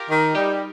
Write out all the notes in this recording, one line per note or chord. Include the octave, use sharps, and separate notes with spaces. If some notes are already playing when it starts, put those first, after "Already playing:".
Already playing: F4 G4 A#4
D#3
G3 D#4 G4